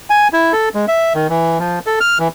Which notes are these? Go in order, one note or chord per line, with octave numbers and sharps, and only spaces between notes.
G#5
E4
A4
G#3
E5
D#3
E3
F3
A4
F6
E3